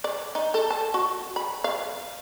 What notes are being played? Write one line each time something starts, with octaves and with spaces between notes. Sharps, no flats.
D5
D#4
A4
A5
F#4
B5
F5